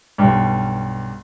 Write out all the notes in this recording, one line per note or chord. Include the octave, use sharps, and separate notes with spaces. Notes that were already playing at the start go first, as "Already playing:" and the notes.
B1 G2